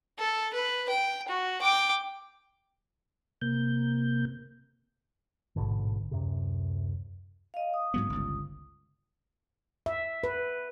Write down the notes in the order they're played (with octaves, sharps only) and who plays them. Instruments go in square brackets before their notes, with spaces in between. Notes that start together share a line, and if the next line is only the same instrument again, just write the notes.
[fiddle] A4
B4
G5
F#4
G5 D6
[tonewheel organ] C3 A#3 G6
[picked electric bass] A1 G#2 B2 D3
D1 F#2 C3
[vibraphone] D#5 F5
D#6
[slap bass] G#2 F#3 B3
G1 C#2
[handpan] E5
B4